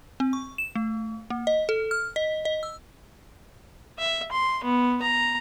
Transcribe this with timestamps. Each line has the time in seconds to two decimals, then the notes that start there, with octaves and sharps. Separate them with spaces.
0.20 C4
0.33 C#6
0.58 E7
0.75 A3
1.30 A#3
1.47 D#5
1.69 A4
1.91 F6
2.16 D#5
2.45 D#5
2.63 E6
3.98 E5
4.32 C6
4.64 B3
5.02 A#5